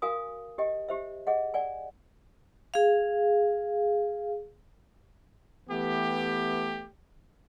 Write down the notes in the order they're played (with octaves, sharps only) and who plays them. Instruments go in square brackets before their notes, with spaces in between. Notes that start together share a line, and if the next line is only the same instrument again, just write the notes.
[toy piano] F#4 A#4 F5 G#5 D#6
G4 D#5 G5
G4 C5 E5
G#4 D#5 F#5
D5 F#5 G#5
[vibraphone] G#4 F5
[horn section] E3 A3 B3 G4